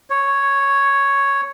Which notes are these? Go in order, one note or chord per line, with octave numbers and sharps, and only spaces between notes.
C#5